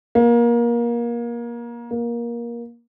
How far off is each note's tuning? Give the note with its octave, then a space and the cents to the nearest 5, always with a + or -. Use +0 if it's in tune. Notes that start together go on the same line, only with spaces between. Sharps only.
A#3 +25
A#3 +20